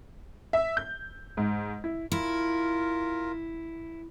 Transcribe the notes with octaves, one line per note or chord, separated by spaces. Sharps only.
E5
G6
G#2
E4
E4 F4 A#4